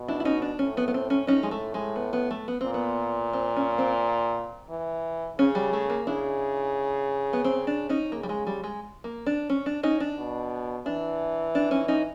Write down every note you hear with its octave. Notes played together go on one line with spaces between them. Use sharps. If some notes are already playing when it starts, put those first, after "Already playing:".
Already playing: B2
D4 E4
E4
C#4 D#4
D4
A2 C#4
B3
B3
C4
C#4
A2 C#4 D#4
G#3
A3
G#3
B3
B3
A3
B3
A#2 C4
B3
C4
C#4
C4
E3
C#3 C#4
G3
A3
A#3
C#3 D4 E4
B3
C4
D4
C#4 D#4
C#3 A#3
G3
G#3
G3
G#3
A#3
D4
C#4
D4
C#4 D#4
D4
B2
E3 D4
D4
C#4 D#4
C#4 D#4